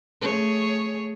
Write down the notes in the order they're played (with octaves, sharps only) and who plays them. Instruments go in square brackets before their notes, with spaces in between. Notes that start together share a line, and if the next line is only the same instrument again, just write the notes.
[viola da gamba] A3 G#4 C#5